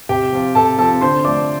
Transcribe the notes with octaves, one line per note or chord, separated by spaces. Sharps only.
C3 G4 G5
F3 C4 F4
C3 A4 A5
F3 C4 F4 A4 A5
D3 C5 C6
F3 A3 D5 D6